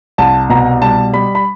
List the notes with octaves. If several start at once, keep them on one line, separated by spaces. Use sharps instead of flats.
C2 A5
B2 A#5
G3 A5
G3 B5
B5